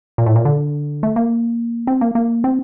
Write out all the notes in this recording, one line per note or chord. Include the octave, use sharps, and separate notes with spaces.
A#2
A2
A#2
D3
A3
A#3
C4
A#3
A#3
C4